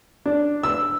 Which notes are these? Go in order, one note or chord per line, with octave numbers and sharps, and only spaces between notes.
D4
E6